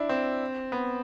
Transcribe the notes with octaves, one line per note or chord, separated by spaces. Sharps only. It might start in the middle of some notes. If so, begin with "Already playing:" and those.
Already playing: D4 E4
C4
B3